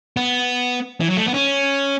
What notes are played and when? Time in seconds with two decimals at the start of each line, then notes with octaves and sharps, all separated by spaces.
0.17 B3
1.00 E3
1.09 F#3
1.17 A3
1.27 B3
1.34 C#4